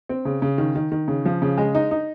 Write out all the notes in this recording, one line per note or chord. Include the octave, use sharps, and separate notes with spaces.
C4
C#3
C#3
D#3
D#3
D#3
C#3
F3
C#3
G#3
D#4
D#4